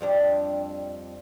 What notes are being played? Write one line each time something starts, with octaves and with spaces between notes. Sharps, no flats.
F2 G3 D4